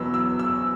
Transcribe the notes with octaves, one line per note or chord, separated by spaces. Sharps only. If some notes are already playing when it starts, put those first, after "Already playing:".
Already playing: E2 B2 F#3 B3 E6
E6
E6